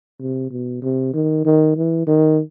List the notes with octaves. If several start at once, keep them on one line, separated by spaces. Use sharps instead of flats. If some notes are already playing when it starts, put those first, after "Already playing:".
C3
B2
C3
D#3
D#3
E3
D#3